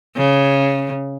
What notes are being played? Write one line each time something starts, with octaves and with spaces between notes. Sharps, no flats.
C#3